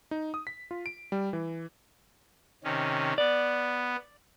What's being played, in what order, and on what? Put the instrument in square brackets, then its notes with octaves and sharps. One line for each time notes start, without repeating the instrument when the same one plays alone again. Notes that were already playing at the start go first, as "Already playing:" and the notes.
[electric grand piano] D#4
D#6
B6
F4
D7
G3
E3
[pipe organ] C3 D#3 C#4
[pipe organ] B3 [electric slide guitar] D5